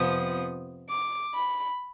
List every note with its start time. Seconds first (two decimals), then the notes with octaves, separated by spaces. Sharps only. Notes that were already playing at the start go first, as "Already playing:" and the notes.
Already playing: F2 C3 F3 B3 D#6
0.89 D6
1.34 B5